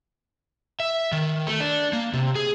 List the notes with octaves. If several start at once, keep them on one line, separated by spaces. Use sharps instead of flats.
E5
D#3
A3
D4
A#3
C3
G#4